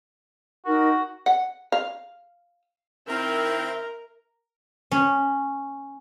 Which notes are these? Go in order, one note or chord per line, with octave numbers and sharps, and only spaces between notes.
D#4 F#4 A#4
F#5
F5
D#3 C4 E4 A#4 E5
C#4